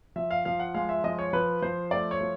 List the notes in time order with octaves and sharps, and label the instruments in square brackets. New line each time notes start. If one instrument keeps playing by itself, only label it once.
[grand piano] F3 E5
F5
F3 F5
F#5
G#3 F5
E5
F3 D#5
C#5
F3 B4
F3 C5
A3 D5
C#5
F3